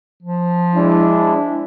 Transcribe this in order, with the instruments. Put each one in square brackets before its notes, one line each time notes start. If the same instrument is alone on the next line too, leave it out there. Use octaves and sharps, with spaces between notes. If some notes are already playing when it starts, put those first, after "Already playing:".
[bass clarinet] F3
[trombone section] G#3 D4 E4